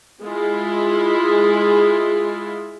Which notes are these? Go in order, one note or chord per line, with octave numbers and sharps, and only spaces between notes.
G#3 E4 F4